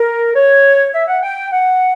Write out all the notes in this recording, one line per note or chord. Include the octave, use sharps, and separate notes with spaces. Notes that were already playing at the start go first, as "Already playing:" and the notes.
Already playing: A#4
C#5
E5
F#5
G5
F#5